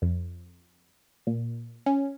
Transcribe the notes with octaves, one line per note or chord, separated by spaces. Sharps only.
F2
A#2
C#4